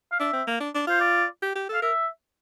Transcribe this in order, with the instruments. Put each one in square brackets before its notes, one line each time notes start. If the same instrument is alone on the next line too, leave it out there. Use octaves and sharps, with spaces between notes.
[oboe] F5
[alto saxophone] D4 [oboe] E5
[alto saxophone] C4
A#3
D4
D4
[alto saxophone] F4 [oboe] C5
[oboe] D5
[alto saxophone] G4
G4
A4
[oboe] F5
[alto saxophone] A#4 [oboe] E5